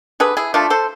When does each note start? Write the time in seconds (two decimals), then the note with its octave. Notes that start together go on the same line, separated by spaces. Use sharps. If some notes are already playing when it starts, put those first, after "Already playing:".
0.20 D3 G#4 B4
0.37 E4 G#4
0.54 F3 A3 D4 F4
0.70 A4 C5